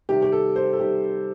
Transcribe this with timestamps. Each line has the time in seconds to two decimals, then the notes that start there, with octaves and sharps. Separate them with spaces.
0.09 C3 D#3 G3 G4
0.22 G4
0.32 A4
0.56 C5
0.73 A4
0.79 C3 D#3 G3 G4